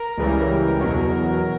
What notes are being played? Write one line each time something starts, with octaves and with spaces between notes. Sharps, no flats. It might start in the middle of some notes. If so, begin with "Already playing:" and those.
Already playing: A#4
C#2 C#3 E3 G3
E2 B2 F#3